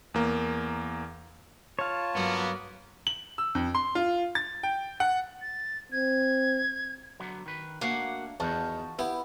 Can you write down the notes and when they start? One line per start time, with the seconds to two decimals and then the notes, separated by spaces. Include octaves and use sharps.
0.14 E2 A#3
1.79 F4 C#5 F5 A5
2.14 G2 F#3 A#3 B3
3.07 F#7
3.38 E6
3.55 F2
3.75 C6
3.95 F4
4.35 A6
4.63 G5
5.00 F#5
5.41 A6
5.92 C4 G#6
7.20 D3 F#3 B3
7.46 D#3 B4
7.81 A3 A#3 D4 F#4 F5 F#5
8.40 E2 D#3 D#4 F4 F#4 A5
8.99 B3 E4 G4